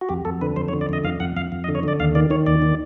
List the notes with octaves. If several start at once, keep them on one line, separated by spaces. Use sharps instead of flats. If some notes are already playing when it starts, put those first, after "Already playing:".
F#4
F2 G4
F2 A4
D3 B4
F2 C5
C#5
D3
D5
F2 D#5
F2 F5
F2 F#5
F2 F5
F2
D#5
D3
C#5
D3 D5
D#2 F5
D#3 D5
D#3 C#5
D#2 D5
D#3